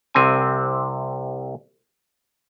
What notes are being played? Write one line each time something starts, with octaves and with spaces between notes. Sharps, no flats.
C2 C3 C4 G#5